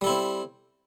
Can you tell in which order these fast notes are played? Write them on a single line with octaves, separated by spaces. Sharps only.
G3 A4 E4 C4